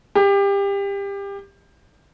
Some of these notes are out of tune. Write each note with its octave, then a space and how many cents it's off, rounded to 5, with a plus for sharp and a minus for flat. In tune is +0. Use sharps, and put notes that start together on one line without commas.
G4 +25